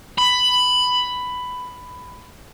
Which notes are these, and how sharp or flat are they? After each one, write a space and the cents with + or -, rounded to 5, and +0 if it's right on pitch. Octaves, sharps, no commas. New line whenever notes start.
B5 +10